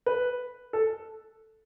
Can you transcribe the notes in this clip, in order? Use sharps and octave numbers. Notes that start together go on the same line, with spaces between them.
B4
A4